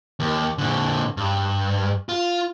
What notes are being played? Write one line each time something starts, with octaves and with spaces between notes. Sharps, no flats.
D#2
A#2 D3
G2
F4